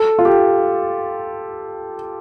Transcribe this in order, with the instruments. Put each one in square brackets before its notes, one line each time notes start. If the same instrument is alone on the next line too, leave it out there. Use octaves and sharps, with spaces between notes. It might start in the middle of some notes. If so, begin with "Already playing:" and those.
Already playing: [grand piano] A4
F4
G4